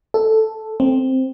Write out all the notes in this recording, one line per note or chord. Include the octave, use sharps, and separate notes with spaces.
A4
C4